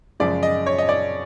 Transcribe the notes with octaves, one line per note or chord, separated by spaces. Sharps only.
F#2 C#3 F3 G#3 D5
D#5
C#5
D#5
D5